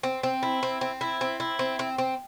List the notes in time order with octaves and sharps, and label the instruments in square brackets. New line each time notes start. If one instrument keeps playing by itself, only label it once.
[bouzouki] C4
C4
E4
C4
C4
E4
C4
E4
C4
C4
C4